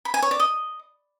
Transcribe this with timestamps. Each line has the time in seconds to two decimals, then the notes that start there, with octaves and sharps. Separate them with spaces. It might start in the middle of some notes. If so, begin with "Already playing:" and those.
0.05 B5
0.14 G#5
0.22 C#5
0.31 D5
0.40 D#5